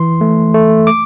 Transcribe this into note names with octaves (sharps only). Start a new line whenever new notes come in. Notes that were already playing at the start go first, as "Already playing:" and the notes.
Already playing: E3 C6
A3
A3
D6